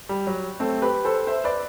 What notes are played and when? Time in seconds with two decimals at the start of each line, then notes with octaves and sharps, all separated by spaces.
0.09 G3
0.27 F#3
0.60 A3 C4
0.82 G4 B4
1.05 A4 C5
1.27 C5 E5
1.44 B4 D5